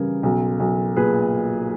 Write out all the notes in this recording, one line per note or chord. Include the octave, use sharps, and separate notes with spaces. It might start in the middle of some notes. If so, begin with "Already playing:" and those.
Already playing: C#3 E3 G3 G#4 A#4
B1
B1
A#2 G#4 B4